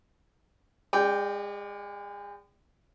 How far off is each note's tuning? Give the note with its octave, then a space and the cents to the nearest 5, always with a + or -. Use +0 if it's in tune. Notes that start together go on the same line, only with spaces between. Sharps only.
G#3 -35 D5 +0 G5 +0